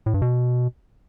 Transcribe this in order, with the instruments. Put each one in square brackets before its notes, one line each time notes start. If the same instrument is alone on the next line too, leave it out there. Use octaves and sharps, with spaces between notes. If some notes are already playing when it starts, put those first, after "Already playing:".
[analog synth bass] A2
G2
B2